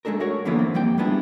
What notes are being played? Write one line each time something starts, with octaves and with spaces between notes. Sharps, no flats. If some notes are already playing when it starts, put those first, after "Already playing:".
G#3 A3 D4 A4 A#4
A3 F#4 A#4 C#5
D3 E3 F#3 A#3 B3 E4
C4
F2 G3 A#3 G5
G3 G#3 B3 D4 E4 F4